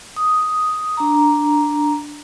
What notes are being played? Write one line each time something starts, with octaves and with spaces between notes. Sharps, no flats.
D#6
D4 A#5